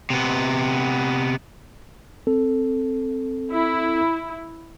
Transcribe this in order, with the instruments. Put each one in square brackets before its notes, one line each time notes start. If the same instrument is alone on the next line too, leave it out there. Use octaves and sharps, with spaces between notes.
[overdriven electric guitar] C3 B3
[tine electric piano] C4 A4
[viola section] E4